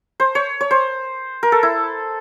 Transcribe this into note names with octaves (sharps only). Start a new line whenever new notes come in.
C5
C#5
C#5
C5
A#4
A4
E4